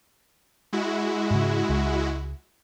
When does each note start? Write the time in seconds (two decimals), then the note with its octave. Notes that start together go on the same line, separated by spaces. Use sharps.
0.73 G#3 E4 F#4
1.30 G#2 C#3
1.69 C#2